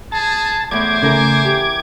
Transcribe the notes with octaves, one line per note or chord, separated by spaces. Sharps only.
G#4 A5
E2 A2 C5 D6 G#6
C#3 A3 E4 A#4 G#5
G4